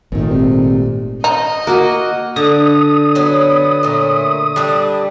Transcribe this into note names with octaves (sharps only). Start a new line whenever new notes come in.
G#1 A#2 D#3 A3
C3
D#4 D#5
A#3 F#4
D3 D#6
F#3 B3
A#2 A3
D3 G3 D4